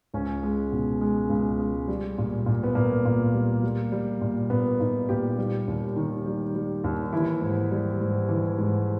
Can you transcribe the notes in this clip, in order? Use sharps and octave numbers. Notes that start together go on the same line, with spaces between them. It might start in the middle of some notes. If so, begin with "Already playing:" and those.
C#2 C#4
G#3
B2
G#3
C#2
G#3
G3
A#2
A#2
B3
A#2 A#3
A#2
G3
G3
G3
A#2
A#2 B3
A#2 D#4
A#2 G4
G3
D#2
D#3
G3
G3
D#2
E3 E4
G#2
G3
G#2
E3
G#2